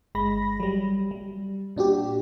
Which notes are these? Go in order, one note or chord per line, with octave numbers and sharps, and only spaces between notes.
G1 G#3 B5 A#6
F#3 G3
G3
A#2 D4 F#4 G4